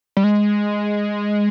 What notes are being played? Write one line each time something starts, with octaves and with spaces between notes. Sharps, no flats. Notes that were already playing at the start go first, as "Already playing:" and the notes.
G3
G#3